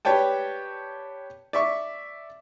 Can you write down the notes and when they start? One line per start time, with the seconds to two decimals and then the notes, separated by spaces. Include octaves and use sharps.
0.05 G4 B4 C#5 D5 G5 A5
1.53 D5 E5 C#6